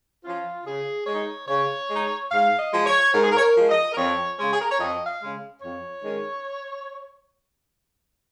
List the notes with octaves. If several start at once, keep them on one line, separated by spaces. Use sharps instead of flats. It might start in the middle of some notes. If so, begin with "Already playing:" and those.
F3 C#4 F4
C#3 G#4
G#3 D#4 C#5
C#3 C#5
G#3 D#4
G#2 F5
D#5
F3 G#3
C#5
G#2 A#4
G#4
A#4
C#5
A#4
F3 G#3
D#5
A#4
F2 C#5
C#3 G#3 C#5
G#4
A#4
C#5
F2 D#5
F5
C#3 G#3
F2 C#5
D#3 G#3 C#4